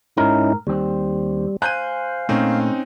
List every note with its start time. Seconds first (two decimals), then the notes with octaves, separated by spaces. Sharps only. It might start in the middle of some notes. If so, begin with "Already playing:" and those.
0.17 G#2 C#4 D#4 E4 A#4
0.67 D#2 G3 C4
1.62 C5 F5 G#5 F#6 G6 D#7
2.29 A#2 A3 C4 C#4 D#4